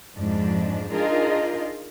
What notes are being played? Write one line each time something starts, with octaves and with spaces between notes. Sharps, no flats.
F2 G#2 F3 G#3 D4
D4 D#4 F4 G#4 A#4 D#5